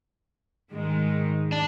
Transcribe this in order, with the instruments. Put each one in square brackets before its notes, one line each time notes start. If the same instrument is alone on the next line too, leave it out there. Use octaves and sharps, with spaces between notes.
[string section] G#2 D#3 G#3
[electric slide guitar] D4